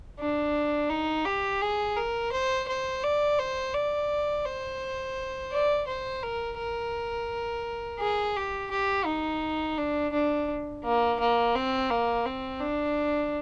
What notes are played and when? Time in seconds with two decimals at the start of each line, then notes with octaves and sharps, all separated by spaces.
0.20 D4
0.90 D#4
1.25 G4
1.61 G#4
1.96 A#4
2.32 C5
2.67 C5
3.03 D5
3.39 C5
3.73 D5
4.45 C5
5.52 D5
5.87 C5
6.23 A#4
6.58 A#4
7.99 G#4
8.36 G4
8.71 G4
9.06 D#4
9.78 D4
10.13 D4
10.84 A#3
11.20 A#3
11.55 C4
11.90 A#3
12.26 C4
12.60 D4